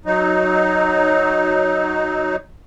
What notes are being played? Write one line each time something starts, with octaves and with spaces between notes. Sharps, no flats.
F#3 D#4